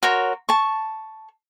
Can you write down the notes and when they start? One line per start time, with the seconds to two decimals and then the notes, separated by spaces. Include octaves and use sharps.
0.03 F#4 A#4 C#5 C6
0.49 A5 C#6